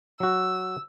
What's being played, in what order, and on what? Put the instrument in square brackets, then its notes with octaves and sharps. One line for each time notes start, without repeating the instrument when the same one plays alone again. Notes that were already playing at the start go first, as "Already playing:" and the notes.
[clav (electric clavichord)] F#3 F#4 [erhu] E6